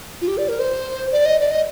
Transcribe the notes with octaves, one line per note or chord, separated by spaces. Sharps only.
F4
G4
D5
A#4
C5
D5
D#5
D5
D#5